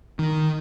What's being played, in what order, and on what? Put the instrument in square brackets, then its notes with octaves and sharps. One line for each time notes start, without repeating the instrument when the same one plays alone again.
[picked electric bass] D#3